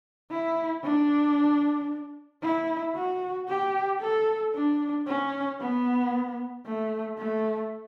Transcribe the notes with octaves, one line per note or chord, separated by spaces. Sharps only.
E4
D4
E4
F#4
G4
A4
D4
C#4
B3
A3
A3